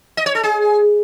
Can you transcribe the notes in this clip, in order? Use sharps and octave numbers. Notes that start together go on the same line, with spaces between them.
D#5
C#5
A4
G#4